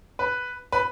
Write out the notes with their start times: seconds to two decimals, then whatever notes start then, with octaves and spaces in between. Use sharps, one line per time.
0.19 B4
0.72 B4